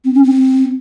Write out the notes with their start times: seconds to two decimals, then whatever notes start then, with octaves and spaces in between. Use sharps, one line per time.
0.05 C4
0.14 C#4
0.24 C4